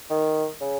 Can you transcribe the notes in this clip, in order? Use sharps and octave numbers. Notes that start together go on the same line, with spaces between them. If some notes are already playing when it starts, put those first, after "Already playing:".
D#3
C#3